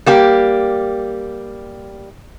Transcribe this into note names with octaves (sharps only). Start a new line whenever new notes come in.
G3 A#3 G4